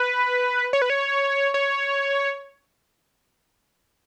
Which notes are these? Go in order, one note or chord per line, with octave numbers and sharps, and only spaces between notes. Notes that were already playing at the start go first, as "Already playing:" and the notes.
Already playing: B4
C#5
B4
C#5
C#5